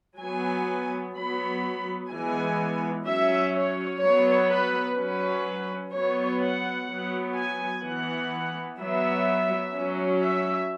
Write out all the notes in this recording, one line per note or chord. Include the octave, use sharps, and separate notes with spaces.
F#3 B3 G#5
F#3 B3 B5
E3 G#3 B3 G#5
F#3 C#4 E5
C#5
F#3 B3 C#5
B4
F#3 C#4 B4
F#3 B3 C#5
F#5
F#3 B3
G#5
E3 B3 F#5
F#3 B3 E5
F#3 C#4
E5